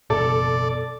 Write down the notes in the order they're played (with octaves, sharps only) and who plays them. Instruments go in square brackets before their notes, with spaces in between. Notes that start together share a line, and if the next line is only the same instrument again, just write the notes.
[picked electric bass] F#1 B2 [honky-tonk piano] A4 [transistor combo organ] D5